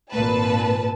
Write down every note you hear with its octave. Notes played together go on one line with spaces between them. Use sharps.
G#1 A#2 B4 A5